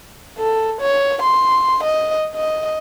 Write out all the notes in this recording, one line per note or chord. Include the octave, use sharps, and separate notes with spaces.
A4
C#5
C6
D#5
D#5